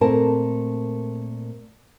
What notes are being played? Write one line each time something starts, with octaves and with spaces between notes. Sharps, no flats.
A#2 A3 C4 A#4 A5